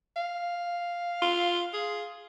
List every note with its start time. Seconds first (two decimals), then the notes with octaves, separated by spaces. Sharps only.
0.16 F5
1.22 F4
1.73 G#4